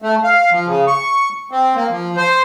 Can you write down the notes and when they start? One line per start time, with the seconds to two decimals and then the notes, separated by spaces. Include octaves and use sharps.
0.02 A3
0.23 F5
0.51 F3
0.67 C#3
0.87 C#6
1.51 C4
1.75 A#3
1.90 F3
2.16 C5